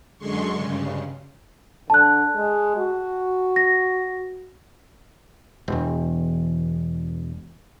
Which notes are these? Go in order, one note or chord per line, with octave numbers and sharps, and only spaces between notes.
F#2 D3 G#3 C6 C#6
G2 C#3
D3 A5 F#6
G#3
F#4
A#6
E1 E2